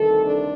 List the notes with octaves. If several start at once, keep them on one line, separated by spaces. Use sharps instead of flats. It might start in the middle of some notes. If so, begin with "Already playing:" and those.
Already playing: D2 C3 D#3 G3 A4
D4